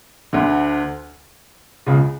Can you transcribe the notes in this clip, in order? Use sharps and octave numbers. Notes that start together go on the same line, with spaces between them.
D2 D3
C#2 C#3